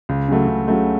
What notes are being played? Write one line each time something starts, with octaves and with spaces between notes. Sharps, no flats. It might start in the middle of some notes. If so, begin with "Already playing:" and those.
C#2
C#3 F#3 A3
C#2
C#3 F#3 A3